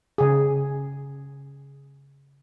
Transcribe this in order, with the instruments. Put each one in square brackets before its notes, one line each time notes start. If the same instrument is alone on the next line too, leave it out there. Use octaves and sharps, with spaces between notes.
[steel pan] C#3 G#4